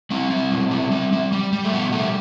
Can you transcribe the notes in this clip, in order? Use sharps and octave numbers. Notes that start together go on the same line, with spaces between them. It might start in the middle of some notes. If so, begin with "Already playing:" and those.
G3 C4
G3
B2
G3
G3
G3
G3
G3
A3
B2 B3
G3 A3